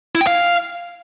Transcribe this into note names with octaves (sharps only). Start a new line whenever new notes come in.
E4
G5
F5